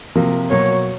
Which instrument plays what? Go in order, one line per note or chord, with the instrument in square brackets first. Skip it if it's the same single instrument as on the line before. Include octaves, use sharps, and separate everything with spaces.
[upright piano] C3 F3 A#3
[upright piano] B2 F#3 A#3 [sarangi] C#5